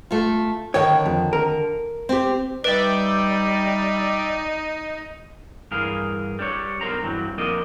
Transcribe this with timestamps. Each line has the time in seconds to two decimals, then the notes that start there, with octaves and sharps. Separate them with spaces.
0.11 A3 F4
0.74 D3 D#3 C#5 G5
1.06 F2
1.33 A#4
2.09 C4 G4
2.64 G3 D#4 B4 D5 E5 G5
5.71 G2 E3 G#4 A#4 F5
6.39 G3 D4 C#5
6.81 B1 B2 D4 A#4 C5 A#5
7.03 G2 E3 F#3 C4
7.38 F2 A#3 D4 F4 A#4 D#5